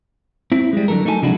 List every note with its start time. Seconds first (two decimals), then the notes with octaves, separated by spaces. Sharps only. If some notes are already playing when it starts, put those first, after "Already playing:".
0.52 C4 E4
0.73 G3 G#3
0.88 D3 F#3 A4 A#4
1.05 A3 D#4 E4 C#5 G#5 A5
1.22 C3 F3 G#3 D4 E4 F#4